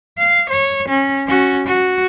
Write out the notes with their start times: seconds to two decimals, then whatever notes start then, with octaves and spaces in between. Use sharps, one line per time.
0.18 F5
0.49 C#5
0.88 C#4
1.27 C#4 F#4
1.66 F#4